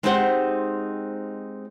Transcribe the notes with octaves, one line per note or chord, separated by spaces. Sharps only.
G#3 C4 D#4 G4 C5 F#5